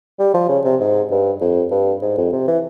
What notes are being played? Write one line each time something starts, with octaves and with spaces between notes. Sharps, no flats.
G3
F3
C#3
C3
G#2
G2
F2
G2
G#2
F2
C3
E3